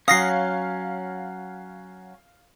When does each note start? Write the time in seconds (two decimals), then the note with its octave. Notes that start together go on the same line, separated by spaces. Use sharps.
0.08 F#3 C#4 F5 D#6 A#6 C7